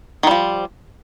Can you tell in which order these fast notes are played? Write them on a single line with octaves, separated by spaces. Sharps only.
D#3 G3 F3